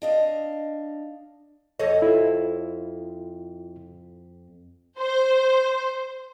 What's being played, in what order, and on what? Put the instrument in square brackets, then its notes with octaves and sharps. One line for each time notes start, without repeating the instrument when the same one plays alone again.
[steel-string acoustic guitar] D4 D#5 F5
[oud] F2 A4 D#5 [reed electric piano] C#5
[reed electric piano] E4 F4
[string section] C5